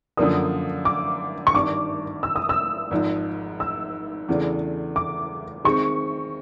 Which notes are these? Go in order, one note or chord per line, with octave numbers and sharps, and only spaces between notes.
F#2 D3 F3 A#3 D4 D#6
D6
C#6
G#1 G2 D#3 D6
E6
D#6
E6
G#1 G#2 F3
E6
E2 C#3 E3 A3 D4
D6
D#3 G#3 C4 C#6